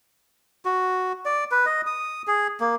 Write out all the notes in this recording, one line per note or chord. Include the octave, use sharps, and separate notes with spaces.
F#4
D5
B4
D#5
D#6
G#4
A#3